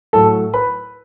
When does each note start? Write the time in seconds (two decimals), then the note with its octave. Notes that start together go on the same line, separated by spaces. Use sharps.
0.13 A2 F#3 A3 A4 A5
0.54 B4 B5